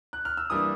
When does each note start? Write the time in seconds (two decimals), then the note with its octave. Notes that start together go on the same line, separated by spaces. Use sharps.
0.13 F#6
0.25 F6
0.37 E6
0.50 E3 G3 A#3 D4 D#6